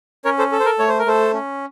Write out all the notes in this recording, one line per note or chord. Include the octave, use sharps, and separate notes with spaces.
C#4 A#4 C#5
A4 C5
A4
C5
A#4
A3 C#5
C5
A#4
A3 A4 C5
C#4